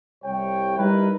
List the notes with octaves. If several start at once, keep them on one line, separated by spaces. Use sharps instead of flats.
C2 C#5 G5
G3 D#4 E4 A#4 B4